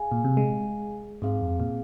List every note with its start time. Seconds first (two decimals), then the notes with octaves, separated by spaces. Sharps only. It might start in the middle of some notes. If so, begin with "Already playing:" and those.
Already playing: G#4 F5 G#5
0.12 A#2
0.25 C3
0.37 G#3
1.22 G#2 C4 G#4 F5
1.41 F2
1.60 A#2